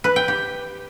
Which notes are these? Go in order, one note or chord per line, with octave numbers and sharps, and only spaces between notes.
B4
G5
G4